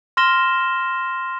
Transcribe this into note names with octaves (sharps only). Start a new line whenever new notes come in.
C6 F6 A#6 E7 G7